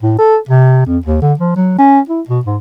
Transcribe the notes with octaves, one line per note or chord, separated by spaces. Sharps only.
A2
A4
C3
F2
D#2
D3
F3
F#3
C#4
E4
B2
G#2